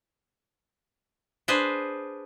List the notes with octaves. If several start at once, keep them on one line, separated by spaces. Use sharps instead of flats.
D4 G#4 B4 C5